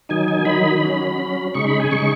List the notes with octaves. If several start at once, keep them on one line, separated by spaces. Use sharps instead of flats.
D#3 F#3 D#4 G#5
G#5
D#3 F#3 D#4 B5
F#3 C#4
F#3 C#4
C#3 G#3 D#4 C#6
B5
G#5
C#3 G#3 D#4 C#6